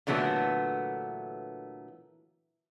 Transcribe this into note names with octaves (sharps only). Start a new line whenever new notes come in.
A#2 D3 E3 F#3 A3 B3